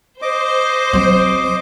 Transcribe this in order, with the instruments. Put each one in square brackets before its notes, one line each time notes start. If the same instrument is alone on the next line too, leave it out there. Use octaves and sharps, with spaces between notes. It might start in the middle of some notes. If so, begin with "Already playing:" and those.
[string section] C5 [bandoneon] D#5 D6
[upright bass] F#3 C4